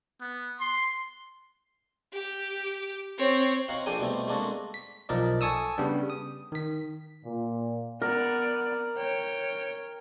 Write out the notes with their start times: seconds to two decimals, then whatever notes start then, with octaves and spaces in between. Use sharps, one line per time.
0.21 B3
0.60 C6
2.13 G4
3.18 C4 C#5
3.68 C4 D#4 F#4 C#5 F5 F#5
3.86 A#1 D4 G#4 A4 G5 G#5
3.99 B2 G3 A3 C4
4.28 G#3 A#3 C4 D4 F#4 A4
4.74 B6
5.09 B1 F3 A#4 D5 D#5
5.41 A4 G#5 A5 C#6 D#6 E6
5.78 C#3 G3 B3 D4
6.10 D#6
6.52 D#3 B6
7.25 A#2
8.02 B3 A#4 D5
8.97 C#5 G5